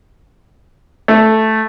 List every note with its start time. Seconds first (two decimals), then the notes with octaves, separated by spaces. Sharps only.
1.08 A3